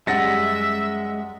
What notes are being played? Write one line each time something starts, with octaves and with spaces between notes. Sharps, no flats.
F#2 G3 G#3 E5 F#5 A6 A#6 C#7